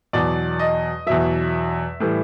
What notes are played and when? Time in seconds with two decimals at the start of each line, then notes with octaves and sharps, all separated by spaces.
0.13 E2 B2 F#3 D5
0.59 D#5
1.06 E2 B2 F#3 E5
2.00 A2 E3 G3